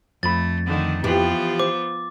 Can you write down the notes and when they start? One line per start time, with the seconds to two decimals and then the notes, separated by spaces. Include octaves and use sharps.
0.23 F2 A3 B5 A6
0.66 D3 D#3 A3
1.04 E3 F3 B3 F4 G4
1.59 C5 D6